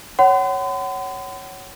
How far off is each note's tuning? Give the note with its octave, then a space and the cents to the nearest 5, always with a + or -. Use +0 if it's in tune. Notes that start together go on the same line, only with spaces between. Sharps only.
C#5 +0 F#5 +35 C6 -45